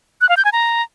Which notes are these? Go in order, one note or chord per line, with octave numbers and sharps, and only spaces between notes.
F#6
F5
G6
G#5
A#5